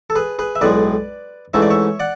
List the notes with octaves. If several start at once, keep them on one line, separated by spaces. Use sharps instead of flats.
A4
G#4 B4
G#4 B4
E5
B1 A2 G#3 B4 D5
G#2 E3 A3 C#4 E5
D5
C#5 E5
D5 F#5